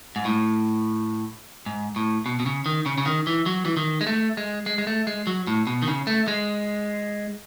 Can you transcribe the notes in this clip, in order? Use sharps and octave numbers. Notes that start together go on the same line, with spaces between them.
G#2
A2
G#2
A2
B2
B2
C#3
D#3
C#3
C#3
D#3
E3
F#3
E3
D#3
G#3
A3
G#3
G#3
G#3
A3
G#3
F#3
A2
B2
D#3
C#3
A3
G#3